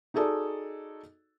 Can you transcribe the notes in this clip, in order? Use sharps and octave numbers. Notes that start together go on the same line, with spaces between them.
D#4 F#4 G#4 A4 D5